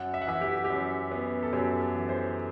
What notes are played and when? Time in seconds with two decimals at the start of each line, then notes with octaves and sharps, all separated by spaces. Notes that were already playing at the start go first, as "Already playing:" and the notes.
Already playing: F#2 F#5
0.14 E5
0.22 F#5
0.27 E3 E5
0.41 G4
0.64 G4
0.70 F#2
1.11 B3
1.43 A4
1.53 F#2 G4
1.80 A4
1.95 E3
2.09 C5